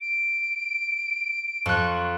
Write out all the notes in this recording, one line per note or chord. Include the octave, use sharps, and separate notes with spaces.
D7
F2 C6 C#6 F#6